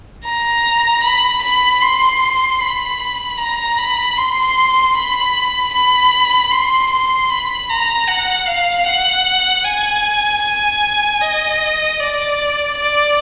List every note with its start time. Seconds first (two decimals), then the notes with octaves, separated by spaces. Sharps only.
0.25 A#5
1.03 B5
1.42 B5
1.81 C6
2.60 B5
3.38 A#5
3.77 B5
4.16 C6
4.94 B5
5.73 B5
6.51 C6
6.90 C6
7.29 B5
7.69 A#5
8.07 F#5
8.47 F5
8.86 F#5
9.64 G#5
10.43 G#5
11.21 D#5
11.99 D5
12.77 D5